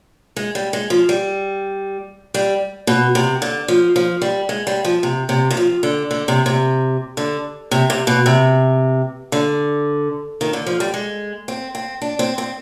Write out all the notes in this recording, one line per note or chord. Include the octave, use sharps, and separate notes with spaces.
G#3
G3
G#3
F3
G3
G3
B2
C3
D3
F3
F3
G3
G#3
G3
F3
C3
C3
D#3
F3
D3
D3
C3
C3
D3
C3
C3
B2
C3
D3
D#3
D3
F3
G3
G#3
C4
C4
D4
C4
C4